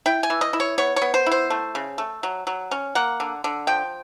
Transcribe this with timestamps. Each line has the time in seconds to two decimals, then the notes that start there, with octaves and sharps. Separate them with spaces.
0.06 E4 G5
0.23 G#5
0.30 E3
0.41 D#5
0.53 E4
0.60 C#5
0.78 B3 C#5
0.96 C#5
1.02 B3
1.14 C5
1.26 E4
1.31 C5
1.50 A3
1.75 C#3
1.98 A3
2.23 F#3
2.47 F#3
2.71 C#4
2.95 A#3 F#5
3.20 D3
3.44 D3
3.67 F3 G5